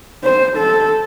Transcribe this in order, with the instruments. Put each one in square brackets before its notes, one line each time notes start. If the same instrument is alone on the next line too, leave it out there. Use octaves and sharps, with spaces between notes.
[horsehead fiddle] C5
A4